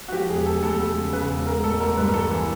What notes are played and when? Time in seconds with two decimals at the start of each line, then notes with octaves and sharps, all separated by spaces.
0.08 F#4
0.12 F3 G4
0.29 E1 G#4
0.46 E1 A4
0.63 D2 A4
0.79 D2 A4
0.97 C#3
1.13 C#3 B4
1.30 E1
1.47 G#3 A#4
1.64 A1 A4
1.80 A1 A#4
1.97 G2 B4
2.09 A#4
2.14 E3 A4
2.30 E3